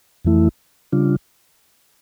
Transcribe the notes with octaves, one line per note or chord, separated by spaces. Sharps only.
F2 E3 A3 E4
C#3 G3 D4 F4